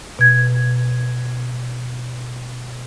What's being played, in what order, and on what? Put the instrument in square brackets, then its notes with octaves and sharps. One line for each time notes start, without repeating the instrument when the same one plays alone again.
[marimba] B2 G#6